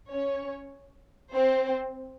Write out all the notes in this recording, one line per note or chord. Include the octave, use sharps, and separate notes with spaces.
C#4 C#5
C4 C5